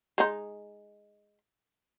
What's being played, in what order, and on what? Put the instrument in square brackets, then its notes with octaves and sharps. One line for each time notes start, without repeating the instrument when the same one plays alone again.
[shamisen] G#3 D#4